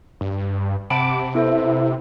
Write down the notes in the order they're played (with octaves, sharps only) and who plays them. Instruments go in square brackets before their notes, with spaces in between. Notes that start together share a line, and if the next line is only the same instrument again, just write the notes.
[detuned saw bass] G2
[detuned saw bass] C3 [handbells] F#5 A5 B5 [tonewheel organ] D6
[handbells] B3 A4 C5 [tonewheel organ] E4